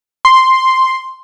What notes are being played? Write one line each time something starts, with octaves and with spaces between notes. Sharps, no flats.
C6